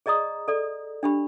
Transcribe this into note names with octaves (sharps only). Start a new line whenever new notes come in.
G#4 D5 D#5 A#5 D#6
A4 D5
D4 G4 B5